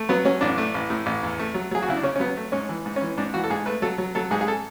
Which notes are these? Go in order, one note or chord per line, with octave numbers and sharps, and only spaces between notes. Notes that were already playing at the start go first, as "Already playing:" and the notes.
Already playing: A3
F#3 B3
F#3 C#4
A1 D4
A3
A1
A2
A1
E2
A3
F#3
F#3 G#4
F#4
C#3 E4
D4
C#3 C#4
C#4
F#3 B3
A3
G#2 C#4
E3
G#2
C#4
E3
G#2 D4
E3 F#4
A4
G#2 G#4
A3 B4
F#3 A4
F#3
F#3 A4
G#2 G#4
G#4
A4